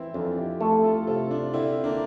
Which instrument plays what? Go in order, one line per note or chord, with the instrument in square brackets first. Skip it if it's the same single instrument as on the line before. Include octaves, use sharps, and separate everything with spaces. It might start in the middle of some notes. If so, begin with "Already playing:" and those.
Already playing: [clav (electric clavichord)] E3 [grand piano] C4 E4
[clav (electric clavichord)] F2 [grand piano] D4 F4
[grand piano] E4 G4
[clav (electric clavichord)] A3 [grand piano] F4 A4
[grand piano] F4 A4
[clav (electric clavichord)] C3 [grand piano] F4 A4
[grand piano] D4 F4
[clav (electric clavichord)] D3 [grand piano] C4 E4
[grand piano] A#3 D4